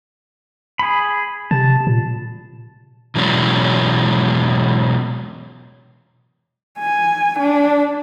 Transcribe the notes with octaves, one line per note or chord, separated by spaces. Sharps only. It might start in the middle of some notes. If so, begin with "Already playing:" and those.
G#4 B5
C3 A5
A#2
B2 E3 F#3 G#3 C#4
G#5
D4